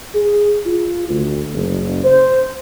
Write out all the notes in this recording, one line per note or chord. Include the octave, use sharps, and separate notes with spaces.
G#4
F4
D2
F#1
C5